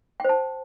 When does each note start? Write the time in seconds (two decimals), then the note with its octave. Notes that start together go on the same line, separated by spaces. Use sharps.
0.20 G5
0.24 C5
0.29 A5